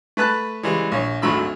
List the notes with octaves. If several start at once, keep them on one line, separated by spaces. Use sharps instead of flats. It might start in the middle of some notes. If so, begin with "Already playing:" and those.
A3 B4 A5 F#6
C#3 E3 G3 G#3
A#1 C#5
G#1 D2 F#3 A3 B5 E6